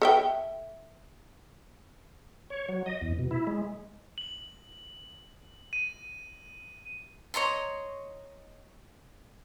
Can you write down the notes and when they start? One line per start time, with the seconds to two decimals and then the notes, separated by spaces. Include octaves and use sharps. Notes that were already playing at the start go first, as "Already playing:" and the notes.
0.02 A4 E5 G5
2.50 C#5
2.69 F#3
2.86 D#5
3.01 E2
3.19 B2
3.31 E4
3.47 G#3
4.18 F#7
5.73 D#7
7.34 C#5 D#5 A#5 C6